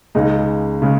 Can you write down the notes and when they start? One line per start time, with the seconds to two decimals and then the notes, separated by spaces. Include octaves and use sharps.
0.15 C#2 C#3 G#3 D#4
0.82 C#3 G#3